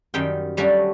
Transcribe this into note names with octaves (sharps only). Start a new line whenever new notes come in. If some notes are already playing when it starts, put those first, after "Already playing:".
F#2 D#3 G3 G5
F#3 G3 A3 C#4 D4 F#4